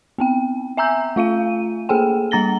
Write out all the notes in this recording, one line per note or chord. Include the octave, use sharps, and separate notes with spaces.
B3 C4 G5
E5 G#5 A#5 E6 G6
A3 F4 F5 D#7
A#3 G#4 A4 G5 G#5
G3 A#3 A#5 A6 A#6 G7